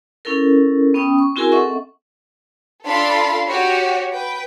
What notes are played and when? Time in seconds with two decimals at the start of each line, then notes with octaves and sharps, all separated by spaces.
0.25 C#4 E4 A4 A#4
0.94 B3 C#4 G5 D#6
1.18 C#6
1.36 C4 E4 F#4 G#4 A#4 G#5
1.52 C4 A4 D#5 E5 F#5 C#6
2.86 D4 F4 A4 F5 B5 C6
3.46 F#4 G4 C#5
4.11 B4 G5